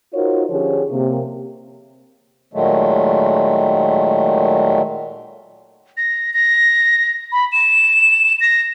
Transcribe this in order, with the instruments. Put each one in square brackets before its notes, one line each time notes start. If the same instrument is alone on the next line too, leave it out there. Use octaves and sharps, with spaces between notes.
[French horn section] D#4 F4 F#4 A#4 C5 C#5
D3 F3 C#4 G4 G#4 C#5
C3 A#3
[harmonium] A#2 D#3 F#3 G#3 A3
[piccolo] A#6
A#6
B5
E7
A#6